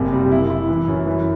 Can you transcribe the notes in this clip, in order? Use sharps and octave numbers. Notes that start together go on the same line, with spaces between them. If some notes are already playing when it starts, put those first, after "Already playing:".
Already playing: F#1 C3
G3
E4
E4
E3
F#2
E3